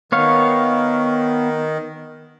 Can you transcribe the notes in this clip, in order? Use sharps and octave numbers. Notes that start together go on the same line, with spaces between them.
D#3 B3 C#5 F5